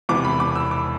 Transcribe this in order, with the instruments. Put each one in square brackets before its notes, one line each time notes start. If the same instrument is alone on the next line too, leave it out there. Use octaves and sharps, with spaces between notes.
[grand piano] E1 E2 C3 E3 B3 D6
B5
D6
E6
D6